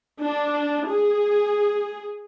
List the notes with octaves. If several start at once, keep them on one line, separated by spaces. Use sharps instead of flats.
D4
G#4